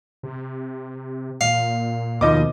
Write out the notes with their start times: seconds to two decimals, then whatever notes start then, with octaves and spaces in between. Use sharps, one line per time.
0.23 C3
1.41 A#2 F5
2.21 D#2 B2 D#3 F3 D#5 D6